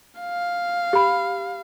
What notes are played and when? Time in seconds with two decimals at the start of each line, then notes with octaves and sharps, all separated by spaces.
0.21 F5
0.93 G4 B5